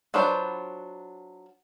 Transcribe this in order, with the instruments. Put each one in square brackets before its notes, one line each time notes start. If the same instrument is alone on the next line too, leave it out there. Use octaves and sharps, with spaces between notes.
[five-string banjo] F#3 D4 F4 B4 C5